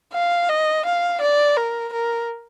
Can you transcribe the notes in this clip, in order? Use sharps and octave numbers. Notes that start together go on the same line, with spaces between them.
F5
D#5
F5
D5
A#4
A#4